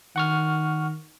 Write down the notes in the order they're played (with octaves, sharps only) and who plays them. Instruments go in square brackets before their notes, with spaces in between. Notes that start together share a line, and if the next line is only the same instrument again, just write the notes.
[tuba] D#3 [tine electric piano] F#5 C#6 F6